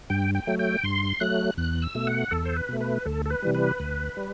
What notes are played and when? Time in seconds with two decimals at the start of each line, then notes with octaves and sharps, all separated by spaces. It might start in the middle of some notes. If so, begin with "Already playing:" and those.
0.10 G2 G5
0.35 G5
0.47 F#3 A3
0.59 G5
0.84 G2 C6
1.20 F#3 A3 F#6
1.58 E2 F#6
1.82 E6
1.95 B2 A3
2.07 F#5
2.31 E2 A4
2.45 C5
2.56 B4
2.69 B2 A3
2.81 B4
3.06 D2 A4
3.26 A4
3.30 B4
3.42 C3 E3 G3
3.55 B4
3.80 D2
4.17 G3